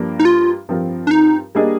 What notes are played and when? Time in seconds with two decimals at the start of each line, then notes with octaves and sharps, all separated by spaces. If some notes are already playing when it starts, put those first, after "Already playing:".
Already playing: G2 F3 A#3 D4
0.19 D#4
0.25 F4
0.69 G2 F3 C4 F4 A#4
1.07 D4
1.11 D#4
1.55 G3 A#3 D4 G#4 D#5